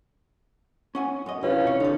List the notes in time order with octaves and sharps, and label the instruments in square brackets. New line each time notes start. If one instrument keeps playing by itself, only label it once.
[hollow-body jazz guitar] C#4 F#5 G#5
F#2 D#5
[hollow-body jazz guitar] C2 [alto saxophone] C#4 [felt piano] E4 F4 B4
[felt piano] C3 [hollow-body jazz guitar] C#5
[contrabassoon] D3 [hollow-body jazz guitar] D#4 A4